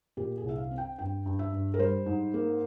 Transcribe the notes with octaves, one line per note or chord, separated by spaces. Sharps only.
A#2 G4
G#4
C2 E5
F5
C4
G5
G2 G5
G2
E5
G2
A#4
G3 C5
G#2
A#3